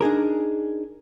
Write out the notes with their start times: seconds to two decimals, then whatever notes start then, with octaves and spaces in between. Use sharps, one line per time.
0.01 D4 D#4 G#4 A#4